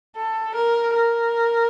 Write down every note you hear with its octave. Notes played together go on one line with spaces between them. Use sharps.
A4
A#4
A#4